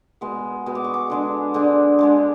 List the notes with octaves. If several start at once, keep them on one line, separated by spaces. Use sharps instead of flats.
B2 G#3 B3
B2 G#3 B3
D6
C#6
D6
D3 G#3 D4
D3 G#3 D4
D3 G#3 D4